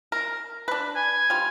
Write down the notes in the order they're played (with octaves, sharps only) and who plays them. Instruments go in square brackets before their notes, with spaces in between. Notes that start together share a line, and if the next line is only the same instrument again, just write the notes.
[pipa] A#4
D4 B4
[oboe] G#5
[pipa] G3 F4